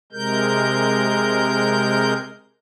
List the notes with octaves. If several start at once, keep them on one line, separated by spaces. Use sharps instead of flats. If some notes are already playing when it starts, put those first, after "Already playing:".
C3 G#3 A#4 G6